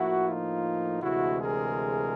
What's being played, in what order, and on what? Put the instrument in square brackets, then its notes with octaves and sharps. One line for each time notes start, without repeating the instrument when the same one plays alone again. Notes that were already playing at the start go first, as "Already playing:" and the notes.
Already playing: [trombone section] A2 F3 A#3 E4 F#4
D#4 F4
D2 C3 E3 G#3 E4 F#4
G#4 A#4